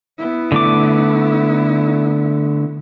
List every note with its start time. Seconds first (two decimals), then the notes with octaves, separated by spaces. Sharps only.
0.18 B3 E4
0.52 D3 A3 D6